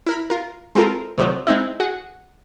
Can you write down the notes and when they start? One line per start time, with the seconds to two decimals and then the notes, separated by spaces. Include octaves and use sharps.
0.06 E4 A#4 B5
0.30 F4 A#4
0.75 G#3 C4 E4 F4 A4 A#4
1.18 D2 C3 D#3 F3 F#3
1.47 G#3 C4 D#4 E4
1.80 F#4 G#4 F#5